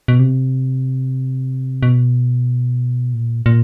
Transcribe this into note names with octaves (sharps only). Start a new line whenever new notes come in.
B2
C3
B2
A#2
A#2